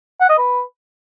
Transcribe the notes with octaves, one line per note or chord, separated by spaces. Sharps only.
F#5
D#5
B4